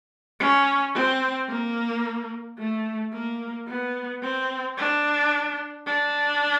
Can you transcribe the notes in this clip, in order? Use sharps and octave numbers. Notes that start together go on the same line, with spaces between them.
C#4
C4
A#3
A3
A#3
B3
C4
D4
D4